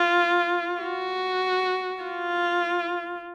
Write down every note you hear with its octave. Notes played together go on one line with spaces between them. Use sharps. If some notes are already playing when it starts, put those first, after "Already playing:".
Already playing: F4
F#4
F4